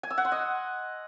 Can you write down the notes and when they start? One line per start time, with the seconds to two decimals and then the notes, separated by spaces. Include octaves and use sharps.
0.03 G#5
0.10 E6
0.18 F#5
0.25 C6
0.32 D#5